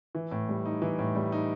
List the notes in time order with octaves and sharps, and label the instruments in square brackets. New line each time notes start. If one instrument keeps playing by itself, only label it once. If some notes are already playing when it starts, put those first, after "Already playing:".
[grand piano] E3
A2
G3
D#4
E3
A2
G3
D#4